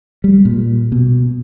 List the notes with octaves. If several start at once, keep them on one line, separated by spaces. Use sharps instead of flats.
G3
A#2
B2